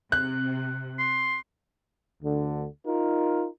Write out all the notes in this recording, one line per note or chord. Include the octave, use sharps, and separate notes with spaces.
C3 F#6
C6
D2 D3
D#4 F4 A#4